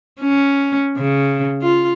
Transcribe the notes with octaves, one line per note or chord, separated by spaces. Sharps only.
C#4
C#3
F4